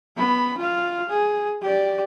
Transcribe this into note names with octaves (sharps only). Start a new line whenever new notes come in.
B3 B5
F4 F5
G#4
G4 D5